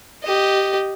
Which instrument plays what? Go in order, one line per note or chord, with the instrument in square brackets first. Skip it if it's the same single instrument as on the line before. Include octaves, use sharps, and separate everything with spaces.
[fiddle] G4 D#5